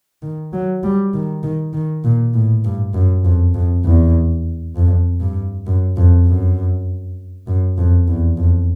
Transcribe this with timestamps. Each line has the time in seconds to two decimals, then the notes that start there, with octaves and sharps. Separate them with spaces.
0.22 D#3
0.53 F#3
0.84 G3
1.14 D#3
1.43 D#3
1.73 D#3
2.04 A#2
2.34 A2
2.65 G2
2.94 F#2
3.24 F2
3.54 F2
3.85 E2
4.76 F2
5.20 G2
5.67 F#2
5.97 F2
6.26 F#2
7.47 F#2
7.78 F2
8.08 E2
8.38 F2